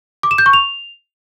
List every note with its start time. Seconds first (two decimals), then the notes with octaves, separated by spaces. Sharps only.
0.23 D6
0.31 E7
0.38 G6
0.46 C#6
0.53 F7